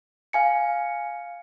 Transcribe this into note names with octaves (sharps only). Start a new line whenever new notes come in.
F5 G#5 C#7